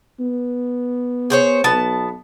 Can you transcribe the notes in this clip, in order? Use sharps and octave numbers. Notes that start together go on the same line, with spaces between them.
B3
G#4 C5 C#5
B1 B3 A5